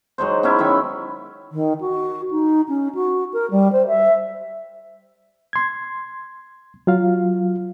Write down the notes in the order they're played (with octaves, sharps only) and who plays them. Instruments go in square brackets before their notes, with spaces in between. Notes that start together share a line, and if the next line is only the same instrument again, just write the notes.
[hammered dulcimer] F#3 G#3 D#4 C5
B3 C#4 E4
D#3 F#3 E5 B5
[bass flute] D#3
F#4
D#4
C#4
F#4
A#4
G3
C5
E5
[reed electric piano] C6 G#6
F#3 F4 F5